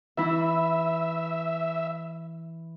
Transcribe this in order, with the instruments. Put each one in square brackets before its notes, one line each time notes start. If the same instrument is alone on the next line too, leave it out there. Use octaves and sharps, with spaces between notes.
[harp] E3 E4 [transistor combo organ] E5